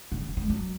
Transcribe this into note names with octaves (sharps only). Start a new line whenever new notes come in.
C#3
E3
G#3
F#3